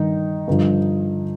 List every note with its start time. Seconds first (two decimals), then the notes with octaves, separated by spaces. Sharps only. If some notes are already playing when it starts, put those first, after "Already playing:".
Already playing: G2 D#3 D#4
0.48 G2 D3 F3